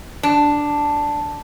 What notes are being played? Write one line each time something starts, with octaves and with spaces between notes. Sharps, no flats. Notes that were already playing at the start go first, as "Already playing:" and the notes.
D4